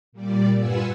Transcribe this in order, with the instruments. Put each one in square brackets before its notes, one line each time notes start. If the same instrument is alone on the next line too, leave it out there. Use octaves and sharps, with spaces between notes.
[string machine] A#2 G3 D5
G2 F4 B4 F#5 G#5 E6